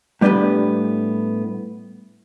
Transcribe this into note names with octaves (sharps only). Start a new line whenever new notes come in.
A2 G3 B3 D4 G4 B4